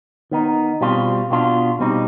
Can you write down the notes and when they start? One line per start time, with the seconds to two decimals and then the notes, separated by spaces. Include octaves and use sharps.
0.31 D#3 B3 D#4
0.81 B2 G3 C4 F4
1.31 B2 B3 D4 F4
1.79 B2 G3 C4 D#4